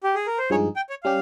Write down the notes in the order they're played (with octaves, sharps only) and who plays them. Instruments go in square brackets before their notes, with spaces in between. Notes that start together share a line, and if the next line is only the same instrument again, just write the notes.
[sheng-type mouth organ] G4
G#4
A#4
C5
[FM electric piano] G2 F3 G#3 D#4 G#4 [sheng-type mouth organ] C#5
[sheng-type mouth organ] G5
C#5
[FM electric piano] G3 C#4 G4 [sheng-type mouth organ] F5